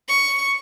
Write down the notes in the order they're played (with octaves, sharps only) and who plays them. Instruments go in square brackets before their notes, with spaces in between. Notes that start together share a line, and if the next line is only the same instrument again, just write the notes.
[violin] C#6